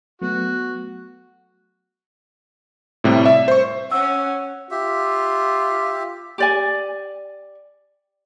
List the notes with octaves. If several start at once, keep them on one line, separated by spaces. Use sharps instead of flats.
F#3 A3 B3 F#4
A2 C3 G3
E5
C5 C#6
C#4 F#5 E6
F4 G4 E5
G4 D5 G#5